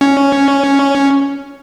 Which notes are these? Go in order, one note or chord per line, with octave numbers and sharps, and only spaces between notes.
C#4